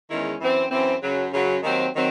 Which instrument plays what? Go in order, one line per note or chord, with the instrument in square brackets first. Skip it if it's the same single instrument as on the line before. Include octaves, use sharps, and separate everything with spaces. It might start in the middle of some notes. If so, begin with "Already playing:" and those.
[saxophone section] E2 D#3 G#3 C#4 E4
F#2 E3 C4
F#2 E3 C4
F#2 C#3 F#3
F#2 C#3 F#3
D#2 D#3 F#3 C4
D#3 F#3 C4